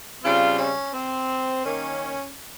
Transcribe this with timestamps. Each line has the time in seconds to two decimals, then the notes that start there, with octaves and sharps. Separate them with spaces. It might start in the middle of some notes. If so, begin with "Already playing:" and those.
0.22 C#3 G3 C4 F4
0.58 C#4
0.94 C4
1.64 D#3 A#3 C#4